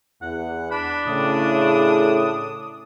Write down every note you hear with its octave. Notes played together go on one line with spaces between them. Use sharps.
E2 F#5
D4 B5
A2 C#3 D#6